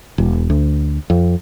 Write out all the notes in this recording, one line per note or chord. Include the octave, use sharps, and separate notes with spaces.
E1
D2
F2